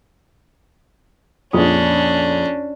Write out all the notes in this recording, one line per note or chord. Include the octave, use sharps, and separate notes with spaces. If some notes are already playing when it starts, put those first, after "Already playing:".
A#1 F2 C#4 D4 D#6